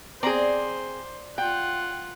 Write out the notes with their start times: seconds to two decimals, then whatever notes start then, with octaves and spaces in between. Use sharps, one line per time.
0.23 C4 G#4 C5 D5 A#5
1.38 F4 F#5 G5